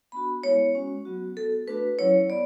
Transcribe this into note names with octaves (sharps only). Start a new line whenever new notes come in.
B3 D4 F#4 B5
G#3 B3 E4 C#5
G#3 C#4 F#4
F#3 B3 F#4
B3 F#4 A4
A3 D4 F#4 B4
F#3 C#4 E4 C#5
B3 D5